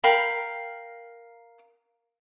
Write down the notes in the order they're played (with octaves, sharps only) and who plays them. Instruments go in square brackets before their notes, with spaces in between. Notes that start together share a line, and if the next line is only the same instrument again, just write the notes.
[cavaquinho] A#4 F5 G5 B5